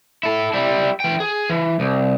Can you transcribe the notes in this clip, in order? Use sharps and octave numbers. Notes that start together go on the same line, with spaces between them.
E4 A4
G3 E4
E3 G5
G#4
E3
C2